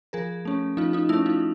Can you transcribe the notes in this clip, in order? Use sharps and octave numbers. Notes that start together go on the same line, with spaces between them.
F3 G#4 A#4
A3 C#4
F3 D#4 F4
D#4 F4
A3 C#4 E4
D#4 F4